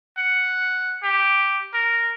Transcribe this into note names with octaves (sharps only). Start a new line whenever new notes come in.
F#5
G4
A#4